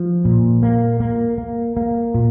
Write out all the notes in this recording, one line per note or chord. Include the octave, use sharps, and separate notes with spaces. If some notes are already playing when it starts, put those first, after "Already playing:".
Already playing: F3
A#2
A#3
A#3
A#3
A#3
A#2